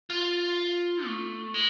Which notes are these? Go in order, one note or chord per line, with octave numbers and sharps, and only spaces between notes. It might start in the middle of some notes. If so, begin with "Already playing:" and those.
F4
A3
G#3